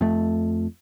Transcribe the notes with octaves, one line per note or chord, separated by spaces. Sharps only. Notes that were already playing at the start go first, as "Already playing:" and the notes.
F2 A3